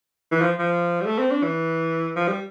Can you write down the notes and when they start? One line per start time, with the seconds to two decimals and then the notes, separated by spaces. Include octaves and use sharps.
0.32 E3
0.41 F3
0.59 F3
1.01 G3
1.06 A3
1.18 C4
1.31 D4
1.43 E3
2.16 F3
2.28 G3